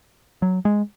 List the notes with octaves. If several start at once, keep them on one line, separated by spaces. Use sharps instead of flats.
F#3
G#3